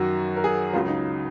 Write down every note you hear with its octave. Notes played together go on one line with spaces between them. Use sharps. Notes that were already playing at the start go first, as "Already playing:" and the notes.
Already playing: F#2 D#3 F#3 F#4
A#4
G#4
C#2 C#3 F#3 F4
D#4